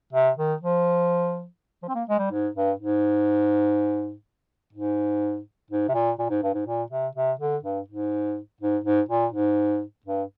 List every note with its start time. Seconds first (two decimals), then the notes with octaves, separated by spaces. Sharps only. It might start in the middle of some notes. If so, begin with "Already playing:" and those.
0.13 C3
0.37 D#3
0.61 F3
1.83 F3
1.88 C4
1.95 A#3
2.09 G#3
2.18 G3
2.31 G#2
2.55 G2
2.79 G#2
4.73 G#2
5.70 G#2
5.89 C3
5.94 A#2
6.19 A#2
6.30 G#2
6.43 G2
6.54 G#2
6.66 A#2
6.90 C3
7.15 C3
7.40 D3
7.63 G2
7.88 G#2
8.60 G#2
8.84 G#2
9.09 A#2
9.32 G#2
10.06 G2